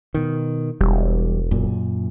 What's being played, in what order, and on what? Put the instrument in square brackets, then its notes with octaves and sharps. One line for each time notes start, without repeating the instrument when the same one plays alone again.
[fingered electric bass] B2 D#3
[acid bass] E1 [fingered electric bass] E2 G3
[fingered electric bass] F#2 A#2